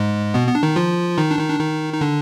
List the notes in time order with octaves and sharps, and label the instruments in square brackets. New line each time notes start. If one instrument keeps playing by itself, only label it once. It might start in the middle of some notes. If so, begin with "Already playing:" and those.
Already playing: [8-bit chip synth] G#2 G#3
B2 B3
B3
D4
D#3 D#4
F3 F4
D#3 D#4
D4
D#3 D#4
D4
D#3 D#4
D#4
D3 D4